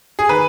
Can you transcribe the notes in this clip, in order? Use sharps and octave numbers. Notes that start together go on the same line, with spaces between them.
G#4
D#3 B4